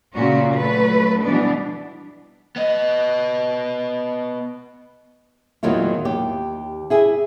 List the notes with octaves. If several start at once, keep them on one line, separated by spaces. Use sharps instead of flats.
A#2 C#3 C#4 F#4
F#3 A3 B4
B2 E3 G3 B3 D4
B3 D#5
E2 A#2 D#3 F#3 E4 F4
D#2 G4
E4 G#4 E5